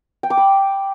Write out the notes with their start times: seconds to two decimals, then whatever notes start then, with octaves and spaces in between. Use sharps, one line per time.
0.23 G5
0.30 D6
0.37 B5